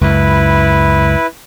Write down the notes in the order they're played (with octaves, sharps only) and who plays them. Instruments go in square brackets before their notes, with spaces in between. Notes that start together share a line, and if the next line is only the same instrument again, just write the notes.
[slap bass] C#2 F#2 [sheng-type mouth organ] E4 B4